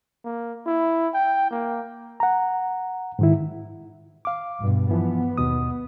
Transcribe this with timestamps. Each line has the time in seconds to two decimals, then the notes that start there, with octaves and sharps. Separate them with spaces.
0.24 A#3
0.66 E4
1.14 G5
1.51 A#3
2.20 F#5 A#5
3.19 G#2 D#3 E4
4.25 F5 D6
4.60 G2 B2
4.91 E3 F3 B3
5.38 D#2 B2 D#6